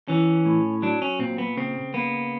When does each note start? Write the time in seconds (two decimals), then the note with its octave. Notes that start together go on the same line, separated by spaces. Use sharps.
0.08 E3 C#4
0.46 A2
0.82 F#3 D4
1.02 C#4
1.19 A#2 C4
1.38 B3
1.57 C#3 C4
1.94 A#3 B3